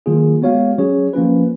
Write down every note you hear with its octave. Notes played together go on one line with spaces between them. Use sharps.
D#3 F#3 A#3 F4 G#4
G#3 B3 F#4 C#5 F5
F#3 C#4 G#4 C#5
F3 A#3 C#4 F4 B4